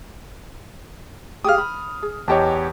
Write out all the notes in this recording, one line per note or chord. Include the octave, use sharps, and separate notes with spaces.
G4 G#4 F5 D#6 F6
B5
G#4
E2 G4 C#5 D#5 G5 A5